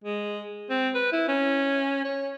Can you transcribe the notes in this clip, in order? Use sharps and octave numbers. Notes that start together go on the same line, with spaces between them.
G#3
C4
B4
E4
C#4
C#5